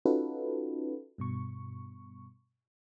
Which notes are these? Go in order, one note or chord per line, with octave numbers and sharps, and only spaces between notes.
C#4 D#4 F4 F#4 A4 B4
G2 B2 C#6